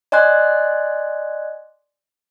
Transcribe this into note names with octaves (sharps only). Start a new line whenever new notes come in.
D5 D#5 G#5 C6 F#6 G#6